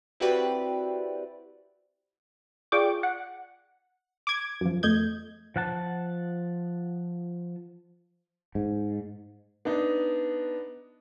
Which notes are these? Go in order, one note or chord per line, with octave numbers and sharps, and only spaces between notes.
C4 E4 F#4 G4 B4 D5
F4 G#4 D5 G5 C#6 D6
F#5
D6 G#6
F#2 F3
F2 A3 D#5 G6 G#6
F3 F#5 A5
G#2
B3 D4 D#4